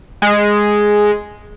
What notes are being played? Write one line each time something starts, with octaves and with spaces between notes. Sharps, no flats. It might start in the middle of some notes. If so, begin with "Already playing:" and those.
G#3